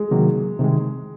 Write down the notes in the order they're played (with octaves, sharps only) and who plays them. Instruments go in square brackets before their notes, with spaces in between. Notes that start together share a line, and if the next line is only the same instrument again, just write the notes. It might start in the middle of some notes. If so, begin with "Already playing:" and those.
Already playing: [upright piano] G#3
[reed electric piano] C3 D#3 F#3 A#3
C3 D#3 G#3